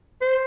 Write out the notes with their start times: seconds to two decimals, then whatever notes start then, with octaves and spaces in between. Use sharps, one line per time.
0.22 C5